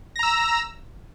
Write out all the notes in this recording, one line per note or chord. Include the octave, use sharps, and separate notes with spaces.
A#5 E6 A#6